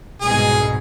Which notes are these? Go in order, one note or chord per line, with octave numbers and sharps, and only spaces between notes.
C2 G#2 B2 G#4